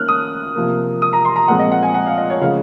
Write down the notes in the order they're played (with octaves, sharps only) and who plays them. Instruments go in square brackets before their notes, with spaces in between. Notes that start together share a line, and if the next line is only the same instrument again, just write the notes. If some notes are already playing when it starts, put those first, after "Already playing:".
Already playing: [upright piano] D#3 A#3 C#4 F6 F#6
D#6
C3 F3 A#3
D#6
A#5
C6
A#5
A#2 F3 G#3 C4 F#5
D#5
F#5
G#5
F#5
F5
D#5
C#5
C#3 F3 G#3 C#4 F5